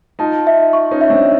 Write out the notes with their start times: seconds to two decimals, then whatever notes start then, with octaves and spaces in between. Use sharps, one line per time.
0.19 D#4 F4 A5
0.47 E5
0.73 C#6
0.91 C#4 D#4
1.01 E5
1.10 C4 D4